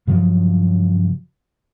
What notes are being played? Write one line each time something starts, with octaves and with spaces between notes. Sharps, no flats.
G2 C#3 F3 F#3